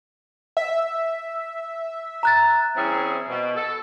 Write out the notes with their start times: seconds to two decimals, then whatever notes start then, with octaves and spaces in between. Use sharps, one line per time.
0.57 E5
2.23 A#5 F#6 A6
2.76 E3 G3 C4 C#4 E4 G#4
3.29 B2
3.56 A4